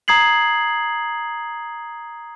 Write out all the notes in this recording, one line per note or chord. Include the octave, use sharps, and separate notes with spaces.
A#5 D#6 G#6 C7 F#7